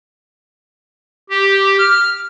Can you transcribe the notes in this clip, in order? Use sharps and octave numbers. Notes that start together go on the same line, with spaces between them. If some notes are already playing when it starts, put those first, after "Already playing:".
G4
F6